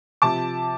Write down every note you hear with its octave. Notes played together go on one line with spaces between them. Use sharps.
C3 F3 A5 D6